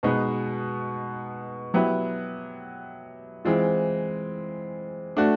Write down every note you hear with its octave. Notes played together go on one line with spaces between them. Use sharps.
B2 G#3 B3 D#4
F#3 B3 E4 G4 B4
E3 G#3 C4 F4
A3 D4 F#4